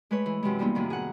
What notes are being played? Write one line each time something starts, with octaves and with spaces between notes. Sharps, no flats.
G#3 A3 B4 C#5
E3
F#2 C3 E3 G#3
G3 A#3 B3 D#4 F4
F#2 A2 C3 D#3
G#4 F#5